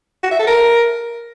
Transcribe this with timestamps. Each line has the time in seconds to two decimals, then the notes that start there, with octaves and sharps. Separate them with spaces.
0.23 F#4
0.31 E5
0.39 A4
0.47 A#4